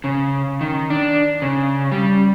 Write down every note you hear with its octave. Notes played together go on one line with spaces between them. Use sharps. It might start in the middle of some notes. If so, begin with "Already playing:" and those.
C#3
D#3
D4
C#3
G3